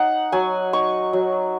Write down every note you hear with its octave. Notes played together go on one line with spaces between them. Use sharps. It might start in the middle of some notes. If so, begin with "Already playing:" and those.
Already playing: D#4 F#5
F#3 G#5
D#4 C#6
F#3